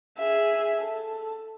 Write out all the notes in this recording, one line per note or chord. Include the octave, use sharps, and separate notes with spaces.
G#4 E5
A4